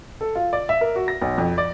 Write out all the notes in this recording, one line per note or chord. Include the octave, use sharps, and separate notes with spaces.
A4
F4
D5
E5
A#4
F#4
A#6
B1
F2
D5